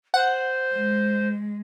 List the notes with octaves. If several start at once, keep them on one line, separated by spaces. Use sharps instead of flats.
C5 F#5
G#3